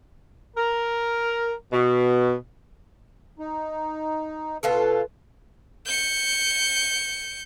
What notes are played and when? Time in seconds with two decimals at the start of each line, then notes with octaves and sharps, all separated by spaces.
0.56 A#4
1.71 B2
3.39 D#4
4.63 B2 F4 A4 B4
5.86 G6 C#7